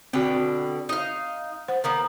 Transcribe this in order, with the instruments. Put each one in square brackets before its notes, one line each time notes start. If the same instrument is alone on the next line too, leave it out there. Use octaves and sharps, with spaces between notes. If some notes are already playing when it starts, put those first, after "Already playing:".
[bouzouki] B2 D3 G5 [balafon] C4 F#4
[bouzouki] D#4 F5
[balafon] C5 F#5
[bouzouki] D#3 A#3 B3